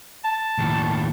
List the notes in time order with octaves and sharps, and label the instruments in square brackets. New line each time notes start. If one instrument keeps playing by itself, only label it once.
[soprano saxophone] A5
[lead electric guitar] D#2 A2